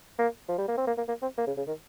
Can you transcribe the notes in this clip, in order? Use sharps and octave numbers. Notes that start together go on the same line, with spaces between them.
A#3
F3
G3
A#3
C4
A#3
A#3
A#3
C4
A#3
C#3
C#3
D#3